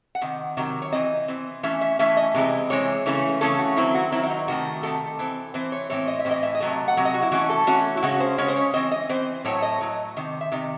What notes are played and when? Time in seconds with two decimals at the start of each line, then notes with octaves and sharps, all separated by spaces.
0.15 F#5
0.21 C3 D#3
0.57 C3 D#3 F#3
0.82 C#5
0.92 E3 C4 D#5
1.28 E3 C4
1.63 E3 A3 C#4 E5
1.81 E5
1.99 E3 A3 C#4 E5
2.17 D#5
2.34 C3 E3 G#3 C4
2.70 C3 E3 G#3 C4 C#5
3.06 C#3 E3 A3 C#4
3.41 C#3 E3 A3 C#4 A4
3.59 F#4
3.76 D#3 F#3 C4 E4
3.94 F#4
4.12 D#3 F#3 C4 E4
4.23 E4
4.30 D#4
4.48 C3 D#3 A3 F#4
4.83 C3 D#3 A3 A4
5.19 E3 C4
5.54 E3 C4 C5
5.72 C#5
5.90 A2 E3 C4 C#5
6.07 D#5
6.19 E5
6.25 A2 E3 C4
6.31 D#5
6.43 E5
6.55 D#5
6.60 C3 F#3 A3
6.88 F#5
6.97 C3 F#3
7.05 D#5
7.14 F#4
7.23 E4
7.32 E3 A3 C#4 F#4
7.50 A4
7.67 E3 A3 C#4 F#4
7.97 E4
8.03 C#3 G#3 C#4 F#4
8.20 C5
8.38 C#3 G#3 C#4 C#5
8.48 C5
8.56 C#5
8.73 E3 C4 D#5
8.91 D#5
9.09 E3 C4 C5
9.45 A2 F#3 A3 C#5
9.62 D#5
9.81 A2 F#3
10.16 C3 D#3
10.41 E5
10.52 C3 D#3